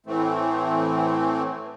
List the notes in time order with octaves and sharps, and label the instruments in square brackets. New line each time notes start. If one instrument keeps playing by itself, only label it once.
[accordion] A2 E3 A3 C4